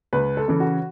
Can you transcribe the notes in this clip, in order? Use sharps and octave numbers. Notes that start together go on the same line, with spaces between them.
C#2 B4
A4
C#3 E3
F#4